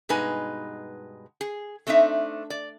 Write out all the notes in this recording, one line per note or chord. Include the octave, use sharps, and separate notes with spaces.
G2 B2 G#3 D#4 B4 G#5
G#4
A3 C4 D4 D#4 E5
D5